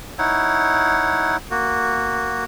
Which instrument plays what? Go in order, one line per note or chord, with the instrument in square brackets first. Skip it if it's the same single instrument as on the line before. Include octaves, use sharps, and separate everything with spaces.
[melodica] D#4 E4 C#5 F#5
A#3 F#4